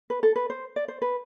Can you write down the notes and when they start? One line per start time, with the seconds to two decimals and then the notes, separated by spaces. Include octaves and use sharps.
0.10 B4
0.23 A4
0.36 B4
0.50 C5
0.76 D5
0.88 C5
1.02 B4